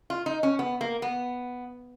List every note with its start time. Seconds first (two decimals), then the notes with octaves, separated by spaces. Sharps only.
0.10 F4
0.26 D#4
0.43 C#4
0.59 B3
0.81 A#3
1.02 B3